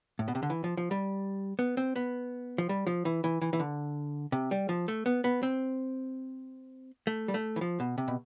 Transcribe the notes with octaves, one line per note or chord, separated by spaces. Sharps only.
A2
B2
C3
D3
E3
F3
F3
G3
B3
C4
B3
F3
G3
F3
E3
E3
E3
E3
D3
C3
G3
F3
A3
B3
B3
C4
A3
G3
A3
E3
F3
B2
C3
B2